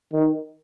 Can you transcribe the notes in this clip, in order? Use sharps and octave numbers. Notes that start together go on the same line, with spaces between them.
D#3